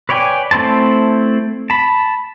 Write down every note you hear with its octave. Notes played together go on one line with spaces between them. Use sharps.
B4 C#5 D5 G5 G#5
A3 C4 E4 C5 A5
A5 B5